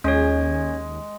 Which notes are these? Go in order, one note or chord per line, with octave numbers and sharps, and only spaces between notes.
D#2 G#3 C#4 C#5